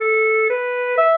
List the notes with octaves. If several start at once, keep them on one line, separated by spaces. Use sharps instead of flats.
A4
B4
E5